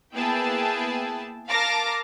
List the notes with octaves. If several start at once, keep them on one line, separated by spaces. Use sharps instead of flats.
A#3 B3 E4 G#4 G5 A5
A#4 F5 A5 D6 A#6